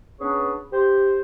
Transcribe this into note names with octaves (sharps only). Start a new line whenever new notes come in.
B3 C#4 D4 G#4 B4 C#5
G4 C5